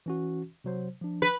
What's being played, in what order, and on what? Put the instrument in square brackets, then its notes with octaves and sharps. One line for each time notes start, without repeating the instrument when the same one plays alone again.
[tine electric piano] E3 C#4 F#4
C3 F#3 C5
F3 D4
[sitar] B4